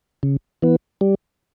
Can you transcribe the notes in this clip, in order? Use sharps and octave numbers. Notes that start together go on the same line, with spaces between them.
C#3
E3 B3
G3